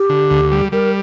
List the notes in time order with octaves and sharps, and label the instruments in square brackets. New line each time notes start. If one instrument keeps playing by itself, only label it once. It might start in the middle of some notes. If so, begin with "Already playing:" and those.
Already playing: [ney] G4
[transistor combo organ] D3
D2
G3
[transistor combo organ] G3 [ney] A#4